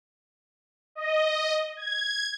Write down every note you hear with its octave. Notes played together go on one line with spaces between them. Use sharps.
D#5
G#6